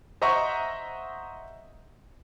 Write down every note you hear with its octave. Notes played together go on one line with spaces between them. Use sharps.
C5 D#5 E5 F#5 A#5 C#6